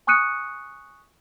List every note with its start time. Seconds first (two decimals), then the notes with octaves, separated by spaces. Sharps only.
0.07 G#5 C#6 D#6 F#6 C#7 D#7